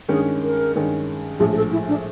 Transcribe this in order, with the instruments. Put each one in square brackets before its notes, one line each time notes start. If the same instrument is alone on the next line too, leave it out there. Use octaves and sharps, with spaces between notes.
[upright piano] G2 D#3 G#3 C#4 [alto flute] G#4
[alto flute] A#4
[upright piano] G2 D#3 G#3 C#4
[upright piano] A#1 A2 F3 G#3 [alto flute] G#4
[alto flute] G#4
A4
E4
D4